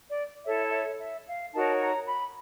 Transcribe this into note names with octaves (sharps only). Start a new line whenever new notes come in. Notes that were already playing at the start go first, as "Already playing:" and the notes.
D5
E4 A4 C#5 E5
E5
E5
F5
D#4 F#4 A#4 C#5 A5
A#5
B5